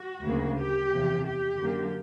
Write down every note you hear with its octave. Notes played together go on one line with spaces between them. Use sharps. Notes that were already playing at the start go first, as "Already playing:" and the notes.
Already playing: F#4
D2 C#3 F#3 A#3
G4
E2 C3 F3
G4
F#2 D3 F#3 A#3